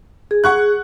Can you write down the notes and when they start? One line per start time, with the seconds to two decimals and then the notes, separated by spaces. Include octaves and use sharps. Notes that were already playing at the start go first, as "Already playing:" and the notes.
0.31 G#4
0.44 F#5 C#6 F#6